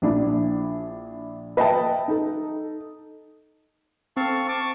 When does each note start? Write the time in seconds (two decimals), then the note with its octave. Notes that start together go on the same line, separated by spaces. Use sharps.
0.02 A#1 D4 E4
1.57 B4 D#5 E5 G5 A5
2.08 D#4 A4
4.17 C4 A4 F5 A5 C#6
4.48 A5 C#6 D6